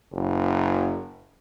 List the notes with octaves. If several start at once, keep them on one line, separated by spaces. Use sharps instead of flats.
F#1